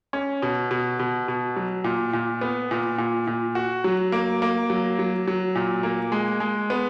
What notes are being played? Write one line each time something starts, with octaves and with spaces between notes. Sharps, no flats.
C#4
B2
B2
B2
B2
F#3
A#2
A#2
B3
A#2
A#2
A#2
F#4
F#3
A#3
A#3
F#3
F#3
F#3
A#2
A#3
G#3
G#3
B3